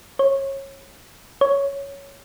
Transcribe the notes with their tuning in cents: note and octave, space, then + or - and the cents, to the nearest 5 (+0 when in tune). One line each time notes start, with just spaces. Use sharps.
C#5 -25
C#5 +5